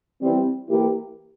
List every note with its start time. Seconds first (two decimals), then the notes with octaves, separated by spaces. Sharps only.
0.20 E3 G3 C4
0.69 E3 A#3 E4 G4